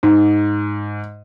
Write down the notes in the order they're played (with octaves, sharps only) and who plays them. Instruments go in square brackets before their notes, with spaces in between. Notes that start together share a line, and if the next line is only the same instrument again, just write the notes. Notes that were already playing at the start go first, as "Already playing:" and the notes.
[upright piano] G#2